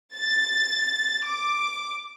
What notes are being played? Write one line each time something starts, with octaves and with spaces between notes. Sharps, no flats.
A6
D6